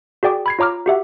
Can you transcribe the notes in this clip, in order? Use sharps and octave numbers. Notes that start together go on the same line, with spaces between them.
F#4 G#4 D5 G5 D6
B5 G#6 C7
F4 C#5 A#5 D6 F6
F#4 G4 E5 F#5